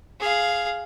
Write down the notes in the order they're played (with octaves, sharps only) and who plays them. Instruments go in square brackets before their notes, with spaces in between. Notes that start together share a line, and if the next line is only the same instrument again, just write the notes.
[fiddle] G#4 F5